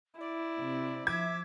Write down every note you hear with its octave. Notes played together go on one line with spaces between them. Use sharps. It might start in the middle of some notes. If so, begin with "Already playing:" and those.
E4 D5
C3
F3 E5 D6 G#6